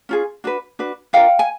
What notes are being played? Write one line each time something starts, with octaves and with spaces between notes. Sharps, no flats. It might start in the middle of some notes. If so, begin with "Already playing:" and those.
C#4 F4 G#4
D4 F#4 B4
D4 F#4 B4
D4 F4 A#4 F5 G5
G#5